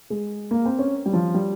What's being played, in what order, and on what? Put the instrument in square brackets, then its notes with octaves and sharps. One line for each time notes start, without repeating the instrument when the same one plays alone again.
[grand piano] G#3
A#3
C4
C#4
G3
F3
G3